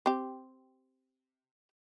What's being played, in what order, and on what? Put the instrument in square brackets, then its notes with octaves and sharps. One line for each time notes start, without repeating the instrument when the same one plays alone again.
[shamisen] C4 G4